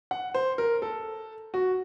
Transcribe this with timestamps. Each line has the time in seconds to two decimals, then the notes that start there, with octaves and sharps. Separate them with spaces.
0.11 F#5
0.34 C5
0.58 A#4
0.82 A4
1.54 F#4